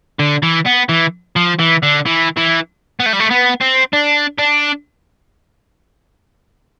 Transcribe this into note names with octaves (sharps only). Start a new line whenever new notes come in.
D3
E3
B3
E3
F3
E3
D3
E3
E3
B3
A3
G3
A3
B3
C4
D4
D4